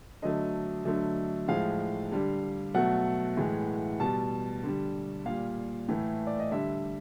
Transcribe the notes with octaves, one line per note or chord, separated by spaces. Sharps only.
D3 F#3 A3 D#5
D3 F#3 A3
A2 F3 G#3 F5
D3 G3
B2 F#3 A3 F#5
A2 E3 G#3
B2 G3 A5
D3 G3
A#2 G3 F5
A2 E3 A3
D5
D#5
D3 G3 E5